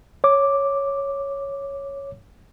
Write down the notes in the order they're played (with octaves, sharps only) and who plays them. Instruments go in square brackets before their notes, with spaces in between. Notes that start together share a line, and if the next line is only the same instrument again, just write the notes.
[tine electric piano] C#5 D6